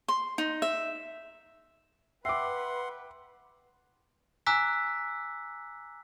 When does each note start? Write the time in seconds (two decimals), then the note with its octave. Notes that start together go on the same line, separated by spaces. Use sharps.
0.08 C6
0.38 D#4
0.62 E5
2.25 B4 E5 F#5 G5 C6 D6 E6 C7
4.46 G#5 A#5 D6 E6 F#6 B6